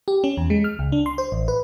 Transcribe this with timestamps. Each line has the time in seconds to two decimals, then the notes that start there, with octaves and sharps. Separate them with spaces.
0.08 G4
0.24 C#4
0.37 E2
0.50 G#3
0.64 F6
0.79 C#2
0.92 D4
1.06 C6
1.18 C5
1.32 A1
1.48 B4